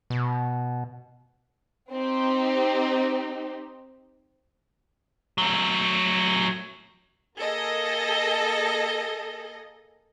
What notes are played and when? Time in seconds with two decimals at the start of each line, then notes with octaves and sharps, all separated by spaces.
0.10 B2
1.91 C4 D#4 G4
5.38 F#3 A3
7.38 A#3 G#4 A4 D#5